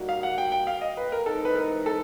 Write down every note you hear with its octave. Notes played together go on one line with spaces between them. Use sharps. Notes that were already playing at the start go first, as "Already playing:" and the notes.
Already playing: G3 A#3 D#4 F#4
F5
F#5
G5
G5
F5
D#5
B4
A#4
E3 G#3 C4 D#4 A4
B4
A#4
A4